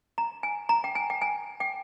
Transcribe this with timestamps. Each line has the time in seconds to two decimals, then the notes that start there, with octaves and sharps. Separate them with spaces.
0.18 A#5
0.43 G#5
0.69 A#5
0.84 G5
0.95 G#5
1.10 G5
1.21 G#5
1.60 G5